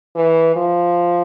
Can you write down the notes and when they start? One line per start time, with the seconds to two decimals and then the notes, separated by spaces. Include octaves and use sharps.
0.15 E3
0.56 F3